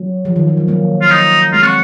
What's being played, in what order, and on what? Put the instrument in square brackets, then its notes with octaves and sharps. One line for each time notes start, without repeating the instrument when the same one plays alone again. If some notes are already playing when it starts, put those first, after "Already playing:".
Already playing: [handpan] F#3
F3
D#3
F3
F#3
F#3 A#3
[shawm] F4
D#4
[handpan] G#3 C4 [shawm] F4
[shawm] F#4